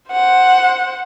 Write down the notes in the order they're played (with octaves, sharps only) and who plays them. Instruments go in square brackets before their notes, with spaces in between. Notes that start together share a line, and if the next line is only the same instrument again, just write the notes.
[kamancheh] C5 F#5